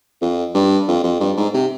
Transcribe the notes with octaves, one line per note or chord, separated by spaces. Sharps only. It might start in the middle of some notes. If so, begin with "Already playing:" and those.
F2
G2
F2
F2
G2
G#2
C3